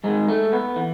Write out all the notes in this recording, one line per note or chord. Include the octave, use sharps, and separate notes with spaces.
G#2 D#3 G#3
A3
B3
E3